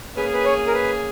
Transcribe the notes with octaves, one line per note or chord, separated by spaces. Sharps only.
A#3 C#4 G#4 B4
B4
C#5
A#4
B4